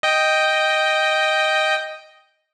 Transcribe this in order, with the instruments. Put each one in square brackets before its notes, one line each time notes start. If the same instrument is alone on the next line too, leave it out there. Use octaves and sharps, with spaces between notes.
[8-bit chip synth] D#5 G5